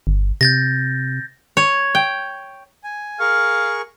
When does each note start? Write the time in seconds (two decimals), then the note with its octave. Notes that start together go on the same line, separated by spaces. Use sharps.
0.07 G1
0.41 C3 G6 A6 A#6
1.57 C#5
1.95 G5
2.84 G#5
3.20 G#4 A#4 F5 C#6